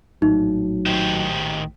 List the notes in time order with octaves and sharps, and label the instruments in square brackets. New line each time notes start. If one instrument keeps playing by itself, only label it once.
[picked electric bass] A#1 A2 [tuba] F#3 [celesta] D#4
[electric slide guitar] D#3 G4 C5